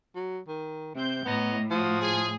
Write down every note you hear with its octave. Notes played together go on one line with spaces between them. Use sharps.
F#3
D#3
C3 C4 G6
A2 B3 C#5 D#5 A#5
F3 F4 F#4 D#6
G#4